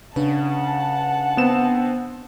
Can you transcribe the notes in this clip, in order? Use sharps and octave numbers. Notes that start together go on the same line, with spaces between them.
C#3 D4 B4 F#5 A5
B3 C4 E7